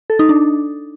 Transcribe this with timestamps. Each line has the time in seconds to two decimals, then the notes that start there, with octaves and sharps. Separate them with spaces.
0.10 A4
0.19 D#4
0.29 D4